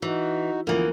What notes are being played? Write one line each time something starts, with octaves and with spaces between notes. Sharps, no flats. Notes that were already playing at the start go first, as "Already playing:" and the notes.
E3 D#4 F#4
D2 E3 F3 A#3 B3